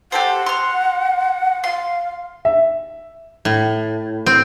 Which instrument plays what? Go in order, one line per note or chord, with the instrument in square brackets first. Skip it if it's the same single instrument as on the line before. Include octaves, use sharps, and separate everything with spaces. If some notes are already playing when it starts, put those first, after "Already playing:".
[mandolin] G4 A4 C5 [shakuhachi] F#5
[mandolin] C6 F6
[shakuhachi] F5 [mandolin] C6
[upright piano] E5
[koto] A2
C4